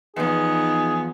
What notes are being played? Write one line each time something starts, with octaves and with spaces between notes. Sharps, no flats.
E2 F3 B3 D#4 G#4